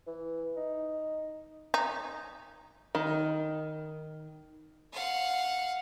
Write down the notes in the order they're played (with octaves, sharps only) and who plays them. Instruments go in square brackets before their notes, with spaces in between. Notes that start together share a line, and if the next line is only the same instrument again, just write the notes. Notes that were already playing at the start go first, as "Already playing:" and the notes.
[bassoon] E3
D#4
[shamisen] D#4
[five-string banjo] D#3
[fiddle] F5 F#5